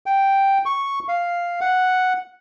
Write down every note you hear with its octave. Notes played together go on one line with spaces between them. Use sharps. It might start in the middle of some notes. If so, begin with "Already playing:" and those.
G5
C#6
F5
F#5